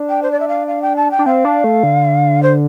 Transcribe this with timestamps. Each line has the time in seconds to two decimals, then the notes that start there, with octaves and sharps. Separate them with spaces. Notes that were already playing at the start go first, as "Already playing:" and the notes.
Already playing: D4
0.09 G5
0.23 C5
0.32 D5
0.40 E5
0.48 F5
0.67 F5
0.82 G5
0.96 A5
1.11 G5
1.19 D4
1.26 C4 F5
1.45 D4
1.64 A3
1.83 D3
2.43 C5